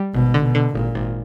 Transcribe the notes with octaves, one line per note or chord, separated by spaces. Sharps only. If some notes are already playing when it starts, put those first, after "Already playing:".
Already playing: G3
G#1 B2
D3
B2
D3
G#1 A#2
G#1